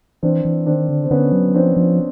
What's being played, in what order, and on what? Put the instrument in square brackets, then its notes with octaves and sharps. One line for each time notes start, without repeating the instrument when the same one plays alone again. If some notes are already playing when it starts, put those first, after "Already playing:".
[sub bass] E3 [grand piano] C4 D4
[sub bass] E3
[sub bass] D#3 [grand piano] C4 D4
[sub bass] D3
[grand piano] C4
[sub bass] D3 [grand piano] B3 C#4
[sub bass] F#3
[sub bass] F3 [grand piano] C4 D4
[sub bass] F3